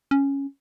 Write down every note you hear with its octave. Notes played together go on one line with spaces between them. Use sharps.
C#4